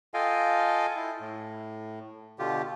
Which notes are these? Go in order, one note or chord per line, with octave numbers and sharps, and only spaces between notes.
F4 A4 D#5 F5 G5 G#5
E4
A2
B2 D3 F4 G4